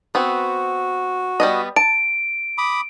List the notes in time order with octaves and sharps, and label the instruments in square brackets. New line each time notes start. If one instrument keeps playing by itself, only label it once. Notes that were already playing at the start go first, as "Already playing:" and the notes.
[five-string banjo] B3 C4 [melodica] F#4
[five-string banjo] G3 B3 D#5
[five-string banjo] A5 [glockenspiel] D7
[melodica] B5 D6 D#6